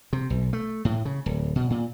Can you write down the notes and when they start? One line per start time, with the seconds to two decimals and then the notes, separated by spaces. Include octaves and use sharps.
0.13 C3
0.30 B1
0.53 A3
0.85 A2
1.05 C#3
1.26 D1
1.56 B2
1.70 A#2